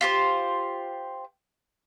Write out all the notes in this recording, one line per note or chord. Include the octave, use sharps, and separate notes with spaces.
F4 G4 C5